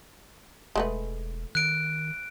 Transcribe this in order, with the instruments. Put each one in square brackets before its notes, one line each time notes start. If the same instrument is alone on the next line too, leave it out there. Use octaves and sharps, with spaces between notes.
[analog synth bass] E1 [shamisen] G#3 A3 B4
[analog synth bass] D#3 [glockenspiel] F#6 D7